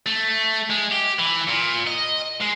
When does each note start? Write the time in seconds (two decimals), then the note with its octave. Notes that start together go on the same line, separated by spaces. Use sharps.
0.06 A3
0.70 G#3
0.91 G4
1.19 E3
1.48 A#2
1.87 D#5
2.41 G#3